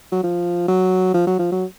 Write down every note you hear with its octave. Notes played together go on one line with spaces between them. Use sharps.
F#3
F3
F#3
F3
F#3
F3
F#3